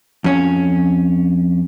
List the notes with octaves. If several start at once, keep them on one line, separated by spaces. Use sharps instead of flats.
F2 C#4